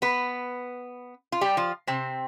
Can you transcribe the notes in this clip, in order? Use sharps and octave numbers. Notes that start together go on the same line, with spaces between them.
B3 B4
F4
G3 G4
F3 F4
C3 C4